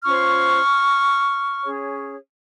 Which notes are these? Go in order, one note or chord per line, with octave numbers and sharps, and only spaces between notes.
C#4 F4 C5 C#6 F6
C#4 G#4 C#5